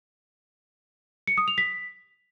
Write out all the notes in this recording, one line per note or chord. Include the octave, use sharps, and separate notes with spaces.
C#7
D#6
F7
B6